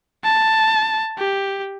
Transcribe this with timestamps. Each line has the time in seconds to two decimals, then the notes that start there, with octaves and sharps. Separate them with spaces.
0.24 A5
1.18 G4